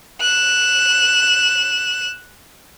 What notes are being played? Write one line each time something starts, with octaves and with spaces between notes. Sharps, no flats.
F#6 E7